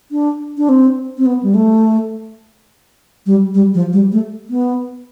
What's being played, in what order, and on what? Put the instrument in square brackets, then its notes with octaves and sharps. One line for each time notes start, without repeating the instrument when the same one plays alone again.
[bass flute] D4
D4
C4
C4
B3
G3
A3
G3
G3
F3
G3
A3
B3